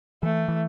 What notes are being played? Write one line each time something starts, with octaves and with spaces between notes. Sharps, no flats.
E3 A3
E3